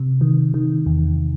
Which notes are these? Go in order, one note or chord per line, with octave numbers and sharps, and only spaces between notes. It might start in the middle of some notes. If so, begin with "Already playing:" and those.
Already playing: C3
D#3
D#3
E2